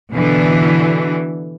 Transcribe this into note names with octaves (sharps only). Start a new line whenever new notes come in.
B2 D3 E3